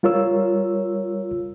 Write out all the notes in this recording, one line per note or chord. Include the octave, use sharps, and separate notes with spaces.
G3 F4 A#4 C#5 E6